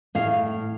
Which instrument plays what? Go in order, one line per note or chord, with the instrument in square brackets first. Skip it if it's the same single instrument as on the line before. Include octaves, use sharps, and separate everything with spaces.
[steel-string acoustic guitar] A2 F5